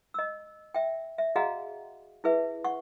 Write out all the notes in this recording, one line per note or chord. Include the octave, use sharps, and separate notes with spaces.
D#5 E6
E5 G5
E5
F#4 G#4 D#5 F5 F#5 A#5
E4 G#4 B4 E5
F#5 C#6